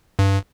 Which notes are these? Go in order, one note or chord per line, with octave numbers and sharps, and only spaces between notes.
G2